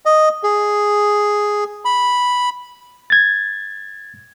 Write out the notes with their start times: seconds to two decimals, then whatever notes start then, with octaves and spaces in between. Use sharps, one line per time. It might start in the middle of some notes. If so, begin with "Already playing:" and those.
0.06 D#5
0.43 G#4
1.85 B5
3.10 G#6 A6